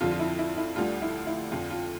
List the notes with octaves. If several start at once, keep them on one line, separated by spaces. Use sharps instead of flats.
F2 D3 F3 F4
F4
E4
E4
E4
D2 D3 G3 F4
E4
E4
F2 D3 F3 F4
F4